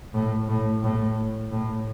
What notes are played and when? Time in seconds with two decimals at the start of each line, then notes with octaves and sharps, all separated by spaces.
0.14 A2
0.49 A2
0.83 A2
1.51 A2